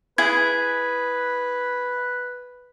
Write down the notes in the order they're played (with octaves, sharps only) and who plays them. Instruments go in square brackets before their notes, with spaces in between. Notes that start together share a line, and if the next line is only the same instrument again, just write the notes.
[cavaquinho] E4 G#4 [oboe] B4 [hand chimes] G#6